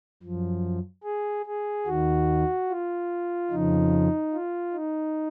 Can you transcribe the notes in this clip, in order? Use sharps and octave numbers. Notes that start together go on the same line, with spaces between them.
F#2 F3
G#4
G#4
D#2 D#3 F#4
F4
F2 C#3 F3 D#4
F4
D#4